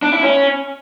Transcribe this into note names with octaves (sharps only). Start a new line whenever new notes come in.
D4
E4
C#4